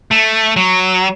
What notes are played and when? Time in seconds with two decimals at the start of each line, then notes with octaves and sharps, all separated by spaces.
0.11 A3
0.56 F#3